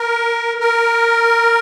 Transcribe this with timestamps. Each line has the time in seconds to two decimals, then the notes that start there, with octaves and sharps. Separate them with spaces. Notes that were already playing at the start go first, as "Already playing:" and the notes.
Already playing: A#4
0.60 A#4